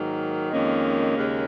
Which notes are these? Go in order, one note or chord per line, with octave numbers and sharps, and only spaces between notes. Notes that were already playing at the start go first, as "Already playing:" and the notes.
Already playing: G#2 D#3 F#3 A#3
F2 D#3 G#3 A#3 C#4
D#2 C#3 G#3